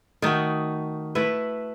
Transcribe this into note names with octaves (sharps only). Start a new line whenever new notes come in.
D#3 A3 D#4 F#4
A3 E4 B4